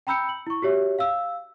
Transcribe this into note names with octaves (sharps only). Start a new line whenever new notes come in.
G5 A#5 B5 E6 G6 C#7
F#7
E4 C#6
F#4 G4 C#5 E5
F5 E6